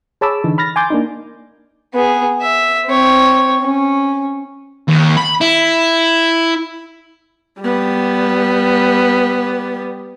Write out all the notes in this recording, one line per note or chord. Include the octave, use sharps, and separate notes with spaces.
G#4 C#5 A5 B5 D6 E6
D3 E3 D#4
B5 F6 A6 A#6
G#5 C6 D6 G6 A6
A#3 D4 D#4
B3 G#4
E5
C4 C#5
C#4
D#2
B5
E4
G3 B3